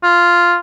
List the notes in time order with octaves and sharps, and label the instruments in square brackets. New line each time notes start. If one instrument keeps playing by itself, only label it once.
[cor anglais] F4